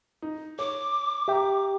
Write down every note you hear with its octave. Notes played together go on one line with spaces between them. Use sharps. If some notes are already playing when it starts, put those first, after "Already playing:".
D#4
C#5 D6
G4 E5 G5 A#5